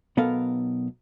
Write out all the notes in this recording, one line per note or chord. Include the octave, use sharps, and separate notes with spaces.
B1 B3 A4 A#4 F5